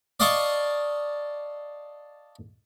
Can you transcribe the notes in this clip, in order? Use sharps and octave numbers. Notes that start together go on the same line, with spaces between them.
D5 D#5 F5 A5 C#6